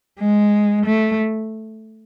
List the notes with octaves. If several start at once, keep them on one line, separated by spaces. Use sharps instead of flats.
G#3
A3